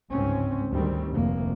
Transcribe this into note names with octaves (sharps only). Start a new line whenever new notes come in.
G1 C#2 G#2 C4 C#4
D2 D#3 G3 C4
F1 D2 A#3